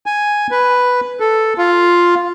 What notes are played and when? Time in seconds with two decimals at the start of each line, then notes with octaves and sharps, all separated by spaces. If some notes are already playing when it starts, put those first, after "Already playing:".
0.06 G#5
0.51 B4
1.20 A4
1.58 F4